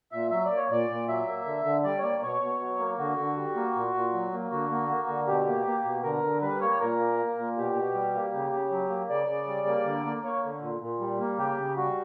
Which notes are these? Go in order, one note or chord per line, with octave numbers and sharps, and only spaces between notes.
A#2 E5
F#3 E5
D5
A#3
C#5
A#2 D5
A#2
F#3 E5
A#3
D3
D3
G3 D5
C#5
A#3 D5
B2 C#5
B2
F#3
A#3
D3 F#4
D3
G3
A#3
A#2
A#2
F#3
A#3
D3 F#4
A#3
A#3
D3
B2 G4
A#3
A#3
B2
D3 A#4
D3
G3 B4
A#3 C#5
A#2 A#4
A#3
A#3
A#2
B2 G4
B2
G3
A#3
C#3 G4
C#3
F#3
A#3
C#3 D5
C#3
G3
A#3
D3
A#3
A#3 C#5
D3
A#2
A#2
G3
A#3
C#3 G4
C#3
G3 F#4